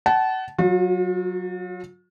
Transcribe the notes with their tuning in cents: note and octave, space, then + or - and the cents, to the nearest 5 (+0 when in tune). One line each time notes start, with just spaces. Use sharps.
F#5 +30 A5 -20
F#3 +0 F4 +45